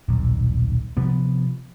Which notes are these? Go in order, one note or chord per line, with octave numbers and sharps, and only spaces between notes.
D#1 B1
C3 F3 B3